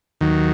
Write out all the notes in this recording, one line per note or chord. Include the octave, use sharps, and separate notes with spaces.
D#2 D#3 F#3